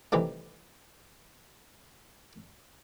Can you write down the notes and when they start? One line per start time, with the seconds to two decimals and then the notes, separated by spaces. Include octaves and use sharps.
0.12 C3 D#3 E3 G3 A3